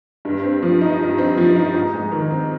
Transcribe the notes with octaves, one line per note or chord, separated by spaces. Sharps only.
G2
C4
F3
D#4
G2
C4
F3
D#4
G#2
G#3
D#3
C4